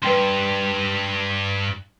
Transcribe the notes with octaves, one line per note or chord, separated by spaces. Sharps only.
G2 B4 G5 C6